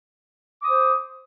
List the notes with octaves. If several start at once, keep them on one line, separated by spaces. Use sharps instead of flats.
C5 D6 D#6